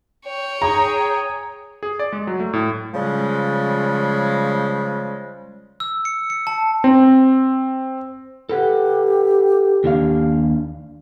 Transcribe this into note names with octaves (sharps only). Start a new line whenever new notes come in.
C#5 G5
G#4 A#5
G#4
D5
G#3
F#3
A3
A2
C#3 F3 G3 G#3
E6
C#7
C#7
A5
C4
G4 A4 B4 F#5
D#2 D4 F5